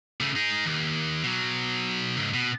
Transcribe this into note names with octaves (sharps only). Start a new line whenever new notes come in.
C#3 A3
D#4 G#4
D#2
B2 F#3
C#2 G#2
B2